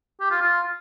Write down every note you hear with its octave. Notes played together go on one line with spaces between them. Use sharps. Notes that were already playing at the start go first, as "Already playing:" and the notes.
G4
F4
F4